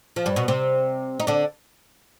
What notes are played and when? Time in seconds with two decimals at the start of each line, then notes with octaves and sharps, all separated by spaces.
0.16 F3
0.26 G2 G3
0.36 B2 B3
0.48 C3 C4
1.20 D#4
1.27 D3 D4